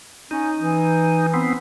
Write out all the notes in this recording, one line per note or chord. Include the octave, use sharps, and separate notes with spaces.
C#4 D#4
E3
B3 C4